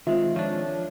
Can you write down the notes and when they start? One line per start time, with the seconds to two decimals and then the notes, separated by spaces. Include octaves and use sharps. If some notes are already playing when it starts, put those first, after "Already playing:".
0.07 D#3 G#3 C4 F4 E5
0.36 F3 D4 C#5